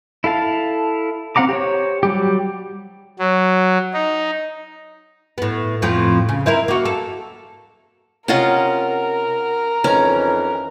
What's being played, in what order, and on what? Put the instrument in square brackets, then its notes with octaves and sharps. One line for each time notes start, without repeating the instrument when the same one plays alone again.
[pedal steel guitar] E4 A4 F5 A5
C4 F5 F#5 A#5 D6
G4 C5 C#5
F#3 G3 G4
[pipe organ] F#3
D#4
[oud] A2 B3
F2 A2 F3
C#3
C4 E4 A#4
A#3 F#4
A4
[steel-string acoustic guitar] C3 F#5 [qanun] C#4 F4 D#5 [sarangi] A#4
[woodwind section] F2 D#3 E3 [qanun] C#4 [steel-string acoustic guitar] G#5 A#5